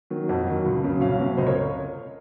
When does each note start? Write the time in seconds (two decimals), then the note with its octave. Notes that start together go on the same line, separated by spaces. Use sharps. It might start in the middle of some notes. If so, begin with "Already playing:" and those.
0.10 D#3 F#3
0.28 F2 D#5 F#5
0.47 D#3 F#3
0.65 C#2
0.83 C#3 F#3
1.01 C2 C#5 F5
1.19 C3 F#3
1.37 C#2 C5 D#5
1.47 A#4 C#5